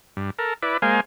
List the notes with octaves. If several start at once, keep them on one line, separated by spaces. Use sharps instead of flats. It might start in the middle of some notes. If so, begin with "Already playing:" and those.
G2
A4 A#4
E4 B4 D5
G#3 A#3 C5 F5 G#5